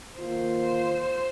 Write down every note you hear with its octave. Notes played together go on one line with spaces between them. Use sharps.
D#3 A#3 F4 C5